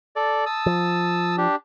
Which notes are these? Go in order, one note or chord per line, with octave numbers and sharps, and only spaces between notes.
A4 D5
A5 D#6 E6
F3
D4 G4